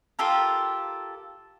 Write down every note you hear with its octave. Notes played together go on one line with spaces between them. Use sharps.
F4 G4 A4 A#4